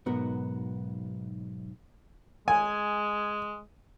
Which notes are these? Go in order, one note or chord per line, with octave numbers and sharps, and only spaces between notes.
B1 G#2 B3 F#4 A#4
G#3 G#5